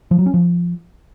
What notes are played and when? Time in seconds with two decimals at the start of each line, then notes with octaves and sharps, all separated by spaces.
0.11 F3
0.19 F#3
0.26 C#4
0.34 F3